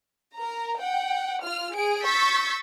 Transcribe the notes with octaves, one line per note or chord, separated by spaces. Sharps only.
A#4 A#5
F#5 G5
F4 F6
G#4 D7
C#6 E6 G6 A6 B6